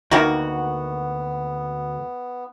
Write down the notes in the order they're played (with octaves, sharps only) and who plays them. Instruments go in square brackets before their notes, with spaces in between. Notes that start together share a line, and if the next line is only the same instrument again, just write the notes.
[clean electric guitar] D2 [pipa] D#3 A#3 F#4 [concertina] B3